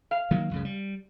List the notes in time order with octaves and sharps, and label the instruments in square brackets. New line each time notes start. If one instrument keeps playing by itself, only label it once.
[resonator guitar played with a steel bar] F5
[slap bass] D#3 F#3 A#3
C#2 F#2 C#3
G3